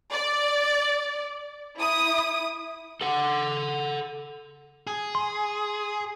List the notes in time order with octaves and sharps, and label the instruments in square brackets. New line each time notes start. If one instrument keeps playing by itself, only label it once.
[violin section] D5
E4 D#6
[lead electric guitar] A4 F#5
G#4
[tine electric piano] C6